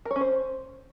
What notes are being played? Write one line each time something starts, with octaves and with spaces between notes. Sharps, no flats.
A#4
C#5
C#4
C5